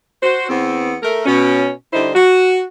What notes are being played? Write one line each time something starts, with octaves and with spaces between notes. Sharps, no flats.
F#4 C5
E2 B3 C4
A3 A#4
B2 C#4
D3 G3 D#4 E4 C5
F#4